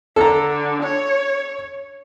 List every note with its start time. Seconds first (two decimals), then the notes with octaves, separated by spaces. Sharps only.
0.16 D3 A4 A#5
0.83 C#5